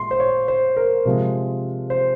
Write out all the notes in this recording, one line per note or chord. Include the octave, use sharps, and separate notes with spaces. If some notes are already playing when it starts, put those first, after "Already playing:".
Already playing: A#2 G#3 C6
C5
C#5
C5
A#4
C3 F3 G#3
C5